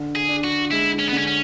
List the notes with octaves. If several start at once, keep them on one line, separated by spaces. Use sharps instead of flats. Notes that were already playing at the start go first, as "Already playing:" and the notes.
Already playing: D3
G#4
D4
F#4
G#3 E4
C#4
B3
D3 C#4
C#4